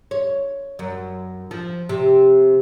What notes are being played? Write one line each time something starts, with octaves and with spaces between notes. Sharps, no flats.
C#5
F#2
F3
C3